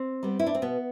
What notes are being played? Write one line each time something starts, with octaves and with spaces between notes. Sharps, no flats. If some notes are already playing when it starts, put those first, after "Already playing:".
Already playing: C4
G3 B3
E4
D4
C4
B2 B3